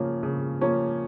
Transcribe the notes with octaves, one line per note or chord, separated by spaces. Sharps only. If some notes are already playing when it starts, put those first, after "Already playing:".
Already playing: C#3 F3 A#3 C#4
C#3
F3 A#3 C#4